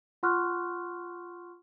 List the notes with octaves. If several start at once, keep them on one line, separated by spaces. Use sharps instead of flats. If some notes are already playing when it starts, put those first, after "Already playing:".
F4 F#5 C6 C#6 F6 F#6